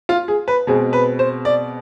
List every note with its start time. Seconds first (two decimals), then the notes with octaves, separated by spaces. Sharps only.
0.09 F4
0.28 G#4
0.48 B4
0.67 B2 G#3 C4 G#4
0.93 B4
1.19 C5
1.45 D5